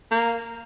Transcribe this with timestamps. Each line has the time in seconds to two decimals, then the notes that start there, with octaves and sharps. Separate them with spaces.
0.11 A#3